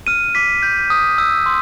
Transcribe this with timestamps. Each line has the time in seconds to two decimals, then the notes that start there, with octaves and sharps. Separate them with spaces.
0.07 F6 D#7
0.35 D6 B6
0.62 G6
0.90 D#6
1.18 E6
1.46 C6